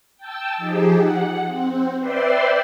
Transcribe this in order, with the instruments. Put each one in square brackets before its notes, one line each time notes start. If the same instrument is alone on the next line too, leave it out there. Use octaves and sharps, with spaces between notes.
[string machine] G5 A5 E6
F3 D#4 G4 G#4
F#5
C4
B4 C5 D5 E5 G5 C6